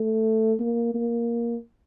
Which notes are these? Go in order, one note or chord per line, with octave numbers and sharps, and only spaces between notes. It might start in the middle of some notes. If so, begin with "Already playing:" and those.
Already playing: A3
A#3
A#3